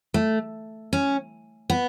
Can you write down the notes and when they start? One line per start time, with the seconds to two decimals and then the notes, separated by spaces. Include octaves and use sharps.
0.14 A3
0.93 C#4
1.70 B3